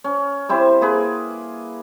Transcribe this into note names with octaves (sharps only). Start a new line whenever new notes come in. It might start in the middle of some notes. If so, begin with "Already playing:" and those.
C#4
G3 C4 E4 C5
A#3 G#4 B4